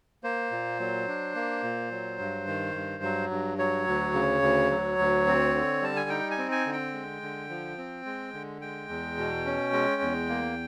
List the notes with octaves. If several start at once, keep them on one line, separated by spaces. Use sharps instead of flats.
A#3 C5
A#2
F#3
D4
A#3
A#2
F#3
G2
D#3
G2
F#3
G2
F#3 C#5
D2
C#3
D2
F#3
D2
C4
D3
G3 A5
G#5
D#4 G5
G#5
C4
G#5
D3
G5
G#3
D3
F3
C4
G#3
D3
G#3 G5
E2
B2
C#4
G#3
E2
A#3